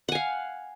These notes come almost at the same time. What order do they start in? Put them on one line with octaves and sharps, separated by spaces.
F#5 G#5 F5